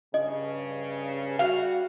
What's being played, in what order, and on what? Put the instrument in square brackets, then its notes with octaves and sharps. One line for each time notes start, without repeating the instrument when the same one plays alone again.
[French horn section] G2 C#3 [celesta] D#5
[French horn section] G3 F#4 [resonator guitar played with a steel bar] F5